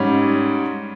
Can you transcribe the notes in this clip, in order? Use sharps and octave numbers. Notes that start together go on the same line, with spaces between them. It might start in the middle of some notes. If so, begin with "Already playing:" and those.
Already playing: G#2 G3 C#4